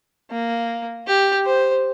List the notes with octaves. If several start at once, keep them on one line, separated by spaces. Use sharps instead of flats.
A#3
G4
C5